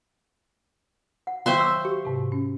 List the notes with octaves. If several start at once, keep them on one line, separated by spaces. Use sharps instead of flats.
F#5
D#3 F#3 C5 E5 F5 G5 C6 C#6
D6 E6
G4
G#2 C3
C#4